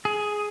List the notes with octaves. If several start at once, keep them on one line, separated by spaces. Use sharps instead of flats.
G#4